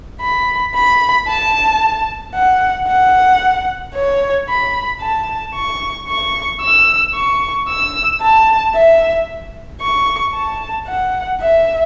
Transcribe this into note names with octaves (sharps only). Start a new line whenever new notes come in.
B5
B5
A5
F#5
F#5
C#5
B5
A5
C#6
C#6
E6
C#6
E6
A5
E5
C#6
A5
F#5
E5